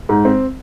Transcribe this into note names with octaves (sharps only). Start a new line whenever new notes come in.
G#2
C4